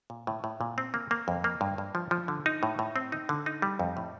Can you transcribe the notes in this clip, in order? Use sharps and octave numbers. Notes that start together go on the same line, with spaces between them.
A#2
A2
A2
A#2
C4
A#3
A#3
F2
A#3
G2
G2
F3
F3
D3
D#4
A2
A2
C4
D#4
D3
D#4
G3
F2
A2